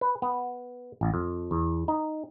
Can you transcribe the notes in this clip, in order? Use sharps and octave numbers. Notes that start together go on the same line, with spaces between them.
B4
B3
A1
F2
E2
D#4